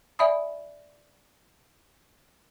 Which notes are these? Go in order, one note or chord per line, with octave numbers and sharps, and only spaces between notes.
D5 E5 G#5 B5 D#6